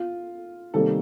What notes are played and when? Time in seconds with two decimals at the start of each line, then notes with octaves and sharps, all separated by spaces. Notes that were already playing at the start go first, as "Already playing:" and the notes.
Already playing: F4
0.74 C3 D#3 G3 A#3 A4